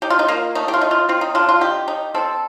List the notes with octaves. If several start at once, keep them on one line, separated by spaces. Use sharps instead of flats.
D#4 G4
F4
D#4
A#3 F4
A3 D#4
G4
F4
D#4
F4
C4 F4
D#4
D3 F4
F4
D#4 G4
D#4
C4 A4